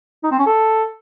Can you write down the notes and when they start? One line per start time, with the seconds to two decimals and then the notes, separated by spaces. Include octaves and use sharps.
0.24 D#4
0.31 C4
0.39 C#4
0.46 A4